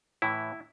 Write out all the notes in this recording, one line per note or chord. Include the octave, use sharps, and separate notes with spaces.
A2 E3 E4